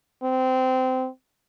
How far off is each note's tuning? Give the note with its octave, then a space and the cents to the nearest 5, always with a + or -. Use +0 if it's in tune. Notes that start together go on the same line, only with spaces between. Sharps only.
C4 -20